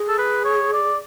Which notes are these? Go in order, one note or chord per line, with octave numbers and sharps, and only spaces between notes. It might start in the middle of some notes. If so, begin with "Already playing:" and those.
Already playing: G#4
A4
B4
C#5
D5